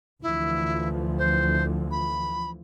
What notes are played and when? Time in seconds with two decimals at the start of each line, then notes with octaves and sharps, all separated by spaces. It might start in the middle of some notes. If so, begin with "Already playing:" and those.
0.22 D2 E3 F3 E4
1.18 C5
1.91 B5